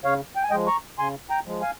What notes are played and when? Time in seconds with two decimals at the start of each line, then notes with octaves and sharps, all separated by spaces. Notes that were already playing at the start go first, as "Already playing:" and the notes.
0.04 C#3 C#5 F5
0.36 G5
0.43 G#5
0.51 F3 G#3 D#5 G5
0.67 A#5 C#6
0.99 C#3 G#5 C6
1.30 G5 A#5
1.46 F3 G#3
1.61 F5 G#5